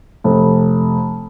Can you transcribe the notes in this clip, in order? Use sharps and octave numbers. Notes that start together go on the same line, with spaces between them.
F1